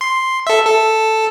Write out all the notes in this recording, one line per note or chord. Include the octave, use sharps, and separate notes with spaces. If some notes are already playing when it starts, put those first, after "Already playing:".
C6
A4 E5
A4